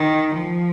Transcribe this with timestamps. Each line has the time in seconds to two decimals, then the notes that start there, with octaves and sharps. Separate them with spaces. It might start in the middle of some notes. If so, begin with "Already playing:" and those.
Already playing: D#3
0.33 F3